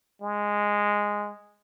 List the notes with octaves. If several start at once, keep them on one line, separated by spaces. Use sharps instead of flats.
G#3